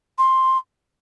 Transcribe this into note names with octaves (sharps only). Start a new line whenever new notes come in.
C6